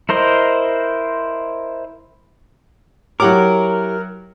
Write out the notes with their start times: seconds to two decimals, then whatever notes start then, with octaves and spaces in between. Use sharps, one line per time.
0.09 E4 A#4 C5 D#5
3.20 F#3 E4 G4 A#4 C#5 F#5 D6